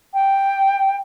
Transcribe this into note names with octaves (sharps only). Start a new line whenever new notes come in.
G5